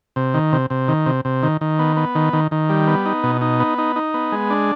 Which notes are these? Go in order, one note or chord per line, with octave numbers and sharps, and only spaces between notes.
C3
D#3
C3
C3
D#3
C3
C3
D#3
D#3
B3
B3
D#3
D#3
D#3
G3
B3
D#4
B2
D#4
B3
D#4
D#4
B3
G#3
D4